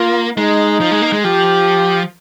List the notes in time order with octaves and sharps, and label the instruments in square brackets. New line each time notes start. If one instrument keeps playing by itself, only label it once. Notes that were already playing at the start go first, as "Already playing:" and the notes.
Already playing: [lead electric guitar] A#3 [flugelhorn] F4
[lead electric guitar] G#3 [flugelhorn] D#4
[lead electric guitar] F3
G#3
A#3
G#3
[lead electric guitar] F3 [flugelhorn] G4